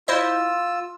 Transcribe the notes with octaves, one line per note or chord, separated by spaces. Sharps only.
E4 F4 C5 D#5 E6